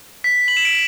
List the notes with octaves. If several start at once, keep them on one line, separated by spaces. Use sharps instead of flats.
B6
F#7
E7
D7